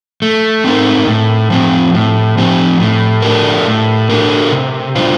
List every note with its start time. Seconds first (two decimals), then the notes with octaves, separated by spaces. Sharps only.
0.22 A3
0.64 C4 D#4 A#4
1.07 A2
1.50 F3 C4 G4
1.94 A2
2.37 F3 C4 G4
2.80 A2
3.22 A3 D4 G4 A#4
3.66 A2
4.10 A3 D4 G4 A#4
4.52 C3
4.95 G3 D4 F4 C5